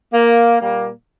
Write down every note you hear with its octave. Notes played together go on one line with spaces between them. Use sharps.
A#3
A#2 G3 A#3